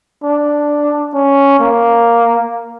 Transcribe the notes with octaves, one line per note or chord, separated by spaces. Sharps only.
D4
C#4
A#3